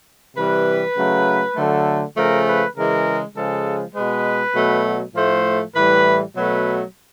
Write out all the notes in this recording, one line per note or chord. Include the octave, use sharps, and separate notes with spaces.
C3 E3 G3 B4
C#3 F#3 A3
D3 F#3 A3
C#3 F3 A3 A#4
B4
C#3 E3 G#3 A#4
C#3 F3 G#3 A4
B2 G#3 B4
B2 F#3 A3
A2 F3 A3 C5
A2 E3 G3 B4
B2 F#3 A3 B4